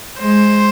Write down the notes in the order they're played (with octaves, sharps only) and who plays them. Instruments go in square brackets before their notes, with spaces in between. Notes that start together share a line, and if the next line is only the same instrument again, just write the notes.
[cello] G#3 [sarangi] C5